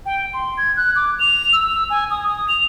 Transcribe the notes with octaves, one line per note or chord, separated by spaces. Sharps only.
G5
C6
G#6
F#6
D6
F7
E6
G#5
D#6
D#6
F7